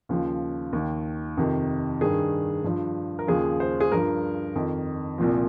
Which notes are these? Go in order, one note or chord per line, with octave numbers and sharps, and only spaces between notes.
D#2 C#3 F3
D#2 D#3
F2 C3 D#3
G2 D#3 G#4
G2 F3
A#4
D#2 C#3 F3 G#4
C5
G#4
G2 F3 A#4
F2 D#3
C2 A#2 F3